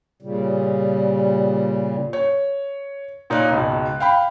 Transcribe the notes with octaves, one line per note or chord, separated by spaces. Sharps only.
A#2 C#3 G3
C#5
A#2 D#4 C#5 D5 F#6
C#2 G#2 B2
F5 G5 B5